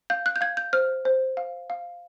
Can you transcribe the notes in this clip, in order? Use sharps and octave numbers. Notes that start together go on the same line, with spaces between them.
F5 G6
F#6
G6
F5 G#6
G6
C5 F6
C5
F5
F5